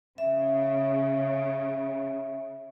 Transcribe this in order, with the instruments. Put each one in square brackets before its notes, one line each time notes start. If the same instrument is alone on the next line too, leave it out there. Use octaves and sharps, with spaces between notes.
[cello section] C#3 [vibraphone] E5